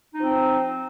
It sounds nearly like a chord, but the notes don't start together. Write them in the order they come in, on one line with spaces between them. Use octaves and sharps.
D#4 F3 C4